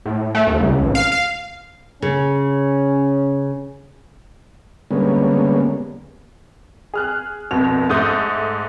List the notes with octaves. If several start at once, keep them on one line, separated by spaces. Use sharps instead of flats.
A2
A3
D#2
C#2
A1
F5
F5
C#3 C#4
D3 G3 G#3 A#3 B3 C#4
G#4 F6 F#6
F1 C2 B2 F7
G#2 A3 A4 D#6 G6